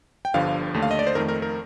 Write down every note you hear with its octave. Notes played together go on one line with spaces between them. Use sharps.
G5
G1 G2 D3 F3 F5
D#2 D3 A3
F5
D#5
D5
C5
F2 D#3 A3 A#4
A#4
A#4